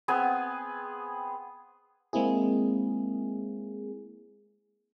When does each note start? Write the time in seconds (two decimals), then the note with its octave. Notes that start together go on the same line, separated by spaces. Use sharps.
0.08 B3 C4 G#4 G#5
2.13 G#3 A#3 C4 E4 G#4